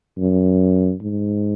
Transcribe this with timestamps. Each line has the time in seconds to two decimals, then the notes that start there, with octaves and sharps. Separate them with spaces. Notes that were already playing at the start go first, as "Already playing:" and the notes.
0.18 F#2
1.01 G#2